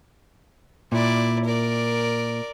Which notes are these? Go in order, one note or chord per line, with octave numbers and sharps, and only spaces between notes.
A#2 E4 D5
A#4 D5